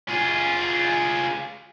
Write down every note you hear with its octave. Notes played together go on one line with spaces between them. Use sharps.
F4 G#4